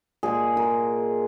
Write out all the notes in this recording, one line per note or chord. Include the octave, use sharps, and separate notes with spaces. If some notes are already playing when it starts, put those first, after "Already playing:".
A#2 G#3 G#4
A#4